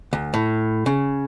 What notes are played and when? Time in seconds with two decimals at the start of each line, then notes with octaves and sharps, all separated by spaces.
0.13 D2
0.34 A2
0.86 C#3